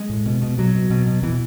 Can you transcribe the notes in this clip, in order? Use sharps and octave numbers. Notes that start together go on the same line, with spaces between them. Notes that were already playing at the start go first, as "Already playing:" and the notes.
Already playing: G#3
A2
B2
B2
B2 F#3
B2
B2
B2
B2 E3